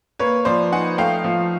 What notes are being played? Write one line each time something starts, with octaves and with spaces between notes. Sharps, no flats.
A#3 B4 C#5
F3 C5 D5
D#4 F#5 G#5
A3 F5 G5
F3